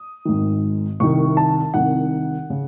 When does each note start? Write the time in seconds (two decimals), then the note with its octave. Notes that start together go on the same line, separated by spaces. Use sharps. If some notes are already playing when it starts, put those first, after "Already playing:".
Already playing: D#6
0.25 G#1 G#2 D#3
1.00 C2 C3 D#3 C#6
1.37 A5
1.74 C2 C3 D#3 F#5
2.50 C#3